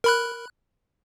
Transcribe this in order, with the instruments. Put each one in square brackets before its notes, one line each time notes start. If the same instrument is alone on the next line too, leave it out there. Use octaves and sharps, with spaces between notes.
[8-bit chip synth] A#4 B5 F#6